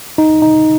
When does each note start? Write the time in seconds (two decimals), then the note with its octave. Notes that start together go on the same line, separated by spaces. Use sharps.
0.18 D#4
0.42 D#4